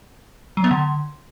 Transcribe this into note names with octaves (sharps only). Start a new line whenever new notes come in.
F#3
B3
D3